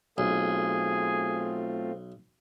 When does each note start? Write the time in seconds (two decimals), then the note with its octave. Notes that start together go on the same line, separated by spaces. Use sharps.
0.18 B1 A3 C4 F4 G#4